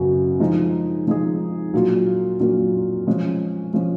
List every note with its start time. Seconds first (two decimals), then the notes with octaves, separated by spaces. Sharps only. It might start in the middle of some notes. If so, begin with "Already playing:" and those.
Already playing: F#2 C#3 F#3 B3 F#4
0.40 F3 G#3 D#4 G#4
1.07 F3 G#3 D#4 G#4
1.74 A#2 F#3 A#3 F4
2.40 A#2 F#3 A#3 F4
3.07 F3 G#3 C#4
3.73 F3 G#3 C#4